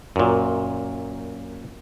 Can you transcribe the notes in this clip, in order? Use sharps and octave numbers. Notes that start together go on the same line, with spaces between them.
F#2 A#2